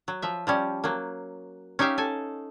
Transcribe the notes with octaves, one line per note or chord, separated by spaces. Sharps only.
F#3
F3 E5
F3 G3 C#4
F#3 A#3
C#4 D#4 G4 E5 F5
A4 G#5